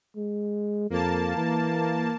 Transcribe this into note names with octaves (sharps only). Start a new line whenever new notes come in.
G#3
F2 A#3 A5
E3